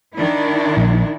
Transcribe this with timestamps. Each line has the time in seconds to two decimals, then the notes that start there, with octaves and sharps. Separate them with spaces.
0.14 D#3 D4 E4
0.77 A#1